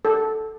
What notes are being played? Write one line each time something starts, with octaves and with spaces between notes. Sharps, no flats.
A4